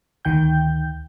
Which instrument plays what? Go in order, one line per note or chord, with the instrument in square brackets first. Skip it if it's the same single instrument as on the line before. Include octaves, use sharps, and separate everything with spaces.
[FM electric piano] D2 D#3 G5 G6